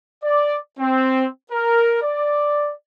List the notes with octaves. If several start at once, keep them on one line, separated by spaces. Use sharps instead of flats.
D5
C4
A#4
D5